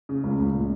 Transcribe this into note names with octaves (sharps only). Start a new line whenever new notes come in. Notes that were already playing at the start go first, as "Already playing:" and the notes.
C#3
C#2
C#2
A#2